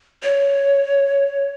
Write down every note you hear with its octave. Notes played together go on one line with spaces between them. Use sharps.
C#5